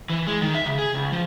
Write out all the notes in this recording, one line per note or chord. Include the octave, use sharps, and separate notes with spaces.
E3
G#3
D#3
E5
C#3
G#4
C#2
F3